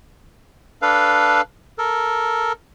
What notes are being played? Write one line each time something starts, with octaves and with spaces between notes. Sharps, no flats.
D4 A4 B4 F5
A4 A#4